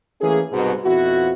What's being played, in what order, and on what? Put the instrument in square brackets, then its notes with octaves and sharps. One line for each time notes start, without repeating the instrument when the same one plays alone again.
[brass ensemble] E3 A3 A#3 C#4 G#4
C2 G#2 B2
F2 B2 F3 E4 F#4